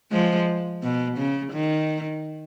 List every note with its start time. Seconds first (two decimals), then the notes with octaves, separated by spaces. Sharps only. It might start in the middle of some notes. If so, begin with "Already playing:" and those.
0.12 F3 G#3
0.83 B2
1.17 C#3
1.52 D#3